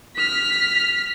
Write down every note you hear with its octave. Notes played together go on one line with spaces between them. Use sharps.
F6 B6